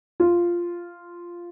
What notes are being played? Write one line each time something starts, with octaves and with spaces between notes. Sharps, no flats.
F4